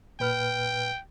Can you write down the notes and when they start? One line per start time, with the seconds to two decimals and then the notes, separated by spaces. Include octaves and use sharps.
0.20 A#2 B4 G5 F6